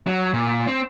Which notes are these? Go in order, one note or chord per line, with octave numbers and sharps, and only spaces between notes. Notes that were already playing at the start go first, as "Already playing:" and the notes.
F#3
A#2
C4